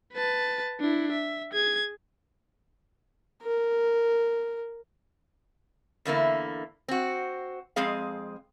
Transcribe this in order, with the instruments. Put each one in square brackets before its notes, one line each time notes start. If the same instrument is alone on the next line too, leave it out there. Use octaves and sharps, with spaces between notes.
[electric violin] B4 A5
D4 E4
E5
G#4 G#6
[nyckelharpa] A#4
[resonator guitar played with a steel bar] E2 D3 A#3 E4
C4 F#4
F2 G#3 C4 G#4 F5